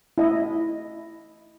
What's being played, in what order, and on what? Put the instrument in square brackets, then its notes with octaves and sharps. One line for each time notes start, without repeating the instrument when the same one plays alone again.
[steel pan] E4 D#5